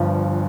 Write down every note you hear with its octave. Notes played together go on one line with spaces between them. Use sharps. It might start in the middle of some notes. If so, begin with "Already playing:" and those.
Already playing: G1 G2 F3